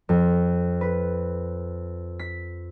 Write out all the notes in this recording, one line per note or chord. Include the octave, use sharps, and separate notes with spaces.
F2
B4
B6